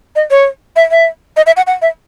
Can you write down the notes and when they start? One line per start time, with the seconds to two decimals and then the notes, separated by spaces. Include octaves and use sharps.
0.16 D#5
0.31 C#5
0.76 E5
0.91 E5
1.37 D#5
1.46 E5
1.57 F#5
1.67 F#5
1.82 E5